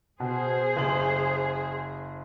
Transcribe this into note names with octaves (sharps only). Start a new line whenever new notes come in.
B2 G#4 C5
F#1 F#7